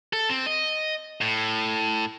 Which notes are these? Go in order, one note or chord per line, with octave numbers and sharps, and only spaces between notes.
A4
C4
D#5
A2